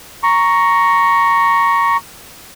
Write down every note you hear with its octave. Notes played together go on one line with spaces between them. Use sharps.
A#5 C#6